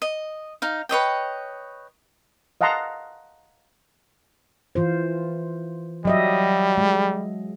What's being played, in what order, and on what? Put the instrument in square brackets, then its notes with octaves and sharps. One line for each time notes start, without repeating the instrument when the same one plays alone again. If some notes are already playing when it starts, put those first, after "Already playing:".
[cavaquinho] D#5
D#4 F5
B4 C#5 D#5 G5
[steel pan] D#5 F5 F#5 A5 A#5 C6
[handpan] E3 F4 C5
[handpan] F#3 D#5 E5 [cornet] G3
[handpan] G#3